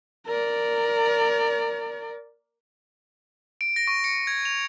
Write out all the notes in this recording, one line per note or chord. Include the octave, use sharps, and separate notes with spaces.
A#4 D5
D7
A#6
C#6
C#7
G#6
F7